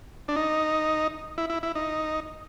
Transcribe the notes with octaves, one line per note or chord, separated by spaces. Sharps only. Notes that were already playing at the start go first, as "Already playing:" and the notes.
D4
D#4
E4
E4
E4
D#4